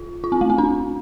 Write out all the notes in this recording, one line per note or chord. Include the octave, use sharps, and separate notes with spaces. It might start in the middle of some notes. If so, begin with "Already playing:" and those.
Already playing: F4
F4
C4
A3
C4
D4